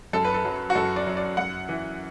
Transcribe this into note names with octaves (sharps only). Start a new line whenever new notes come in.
F#2 A4
B4
A4
F#3
F#4
F#2 A4
D5
F#3
D5
F#2 F#5
E3